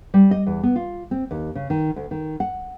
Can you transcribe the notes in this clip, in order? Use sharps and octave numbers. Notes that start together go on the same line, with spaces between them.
G3
D#5
E2
B3
F4
C4
D#2
C#3
D#3
D2
D#3
F#5